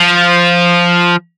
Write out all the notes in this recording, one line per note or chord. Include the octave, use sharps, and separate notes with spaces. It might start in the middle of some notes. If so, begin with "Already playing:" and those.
Already playing: F3